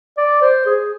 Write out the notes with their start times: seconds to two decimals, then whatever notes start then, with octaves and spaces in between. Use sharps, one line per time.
0.18 D5
0.42 C5
0.66 G#4